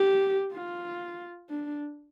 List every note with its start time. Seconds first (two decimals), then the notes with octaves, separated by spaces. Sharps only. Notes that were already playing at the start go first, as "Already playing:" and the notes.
Already playing: G4
0.53 F4
1.50 D4